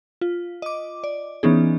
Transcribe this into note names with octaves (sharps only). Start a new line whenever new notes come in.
F4
D#5 D6
D5
E3 B3 C#4 D#4 G#4